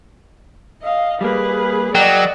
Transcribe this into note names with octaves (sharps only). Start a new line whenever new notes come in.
D#5 F5
G3 A#3 G#4 B4
F#3 G#4 A#4 D5 D#5 G5